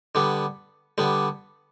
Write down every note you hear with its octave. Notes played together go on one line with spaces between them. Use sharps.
D3 G3 B3
D3 G3 B3